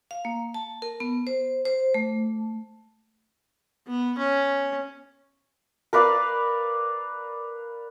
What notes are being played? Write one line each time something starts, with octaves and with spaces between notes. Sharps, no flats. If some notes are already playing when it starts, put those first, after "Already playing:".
F5
A#3
A5
A#4
B3
C5
C5
A3
B3
C#4
A#4 B4 D5 F5